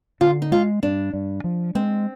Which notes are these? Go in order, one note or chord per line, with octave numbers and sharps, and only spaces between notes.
D3 F4
D#4
G#3 F4
G2 D4
G2
F3
G#3 C4